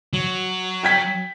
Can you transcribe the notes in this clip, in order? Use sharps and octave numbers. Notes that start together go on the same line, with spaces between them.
F#3
G5 G#6 B6